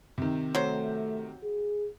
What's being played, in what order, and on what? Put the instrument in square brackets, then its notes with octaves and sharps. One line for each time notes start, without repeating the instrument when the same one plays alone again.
[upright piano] C3 D#3
[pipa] F#3 C5 [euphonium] A3
[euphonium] G#4